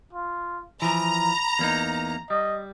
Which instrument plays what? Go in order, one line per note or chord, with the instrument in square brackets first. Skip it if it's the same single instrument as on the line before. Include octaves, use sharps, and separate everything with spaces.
[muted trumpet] F4
[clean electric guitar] E3 F3 [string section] A#5 [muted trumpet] B5
[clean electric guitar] E2 A#3 D#4
[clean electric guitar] G3 [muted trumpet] D#5